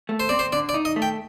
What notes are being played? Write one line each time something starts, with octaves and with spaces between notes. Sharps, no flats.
A3
C5
C4 D5
C5
D3 D5
D5
D#4
D#5
A3
G5